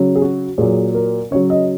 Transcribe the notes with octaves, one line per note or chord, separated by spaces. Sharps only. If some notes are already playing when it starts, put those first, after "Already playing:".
Already playing: C#3 F#3
G#4
F#4
A#2 F#3 G#4
A#4
C#3 F#3 C#5
D#5